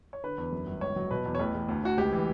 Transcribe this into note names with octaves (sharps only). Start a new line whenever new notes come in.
C#5
D3 B4
E2
F#2
G1
C#2 C#5
F#3
B2 B4
E2
C#5
A1 B4
A1
D2
D2 F#4
C#2 G4
E3